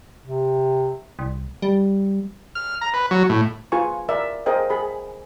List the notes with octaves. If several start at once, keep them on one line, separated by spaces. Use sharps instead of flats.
C3
C2
G3
F6
A#5
B4
F#3
A2
F4 G#4 B4 G#5 C#6
A#4 D5 E5
G#4 A#4 C5 D#5 G5
G#4 B5